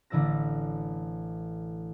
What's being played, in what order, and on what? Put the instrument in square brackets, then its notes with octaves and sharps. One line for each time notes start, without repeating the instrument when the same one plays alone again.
[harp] A1 D3 E3 D5 E6 A#6